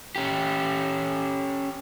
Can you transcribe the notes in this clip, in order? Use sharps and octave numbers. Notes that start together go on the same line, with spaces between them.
C#4 G4